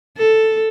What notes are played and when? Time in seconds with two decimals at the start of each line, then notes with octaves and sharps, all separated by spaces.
0.18 A4